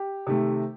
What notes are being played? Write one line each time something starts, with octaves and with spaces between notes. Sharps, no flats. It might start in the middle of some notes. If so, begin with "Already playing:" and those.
Already playing: G4
C3 D#3 A3